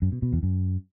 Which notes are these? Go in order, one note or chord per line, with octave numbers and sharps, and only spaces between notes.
F#2
B2
B2
E2
F#2